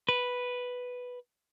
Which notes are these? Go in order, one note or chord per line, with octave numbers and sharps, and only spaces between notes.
B4